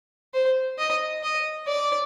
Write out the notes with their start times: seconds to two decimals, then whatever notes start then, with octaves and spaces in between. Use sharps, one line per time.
0.34 C5
0.79 D#5
1.23 D#5
1.67 D5